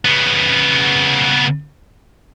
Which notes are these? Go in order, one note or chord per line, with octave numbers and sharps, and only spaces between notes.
C#3 B3